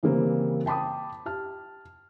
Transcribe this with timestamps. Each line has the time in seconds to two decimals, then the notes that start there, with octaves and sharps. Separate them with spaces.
0.03 C#3 E3 G3 A#3 C4
0.66 G5 A5 B5 D6 D#6
1.26 G4 A5 F6